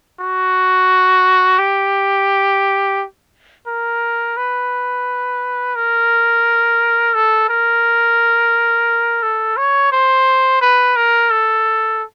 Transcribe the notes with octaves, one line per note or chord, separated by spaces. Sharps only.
F#4
G4
A#4
B4
A#4
A4
A#4
A4
C#5
C5
B4
A#4
A4